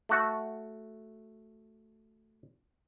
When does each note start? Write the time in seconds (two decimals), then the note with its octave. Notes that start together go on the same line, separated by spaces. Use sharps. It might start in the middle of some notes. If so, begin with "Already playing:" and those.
0.09 A3 F#4